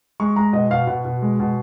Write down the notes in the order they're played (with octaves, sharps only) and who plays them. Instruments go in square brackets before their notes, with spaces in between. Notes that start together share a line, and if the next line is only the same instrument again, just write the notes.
[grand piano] G#3 C#6
G#3 A#5
B2 D#5
B2 F5
B2 F#5
B2
G#3
B2